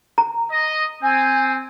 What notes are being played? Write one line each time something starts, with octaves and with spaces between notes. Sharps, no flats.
A#5
D#5
C4 G#5